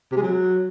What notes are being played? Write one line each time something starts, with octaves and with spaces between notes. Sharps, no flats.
C3
G#3
F#3